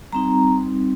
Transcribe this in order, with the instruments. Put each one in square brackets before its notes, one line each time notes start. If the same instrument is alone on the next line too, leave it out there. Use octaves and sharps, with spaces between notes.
[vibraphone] G3 C4 D#4 A#5